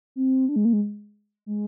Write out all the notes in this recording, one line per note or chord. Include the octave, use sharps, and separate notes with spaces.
C4
D4
G#3
A#3
G#3
G#3